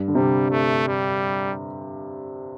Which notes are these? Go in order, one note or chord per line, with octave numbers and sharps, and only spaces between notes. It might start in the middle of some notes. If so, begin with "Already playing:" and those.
Already playing: G2
D3
C3 G3
A3
G3